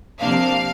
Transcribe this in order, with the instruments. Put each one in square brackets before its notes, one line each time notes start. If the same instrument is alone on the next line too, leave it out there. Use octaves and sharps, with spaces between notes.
[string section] C3 F3 A#3 D4 F5